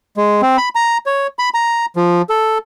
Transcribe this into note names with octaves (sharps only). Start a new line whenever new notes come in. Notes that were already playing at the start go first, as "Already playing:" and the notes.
G#3
C4
B5
A#5
C#5
B5
A#5
F3
A4